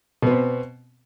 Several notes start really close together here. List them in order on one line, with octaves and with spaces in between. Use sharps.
B2 B3 C4